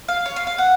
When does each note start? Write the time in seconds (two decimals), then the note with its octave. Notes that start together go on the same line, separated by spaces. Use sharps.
0.08 F5
0.26 C#5
0.36 F5
0.47 F5
0.58 F#5